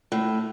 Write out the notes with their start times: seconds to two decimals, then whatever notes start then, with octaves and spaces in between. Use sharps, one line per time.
0.12 A2